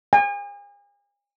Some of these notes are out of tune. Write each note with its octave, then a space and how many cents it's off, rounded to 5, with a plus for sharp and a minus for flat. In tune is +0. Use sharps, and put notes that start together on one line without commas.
G#5 -40